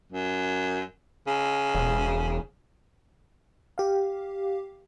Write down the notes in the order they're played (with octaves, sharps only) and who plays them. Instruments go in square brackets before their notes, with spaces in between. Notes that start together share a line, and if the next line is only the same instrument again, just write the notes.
[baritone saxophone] F#2
C#3
[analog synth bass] E1
[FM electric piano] G4 F5